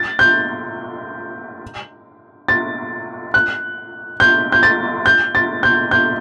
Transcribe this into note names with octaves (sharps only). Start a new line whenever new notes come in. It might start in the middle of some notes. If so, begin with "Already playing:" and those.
Already playing: A6
G6
A6
F#6
G6
G6
A6
G6
A6
G6
G6